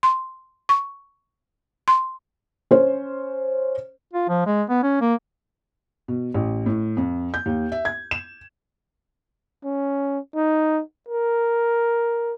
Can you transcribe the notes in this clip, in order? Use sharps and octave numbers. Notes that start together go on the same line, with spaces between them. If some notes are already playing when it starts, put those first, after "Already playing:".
C6
C#6
C6
C#4 C5
F4
F3
G#3
B3
C#4
A#3
B2
A1
A2
F2
G6
D#2
E5
G#6
E7
C#4
D#4
A#4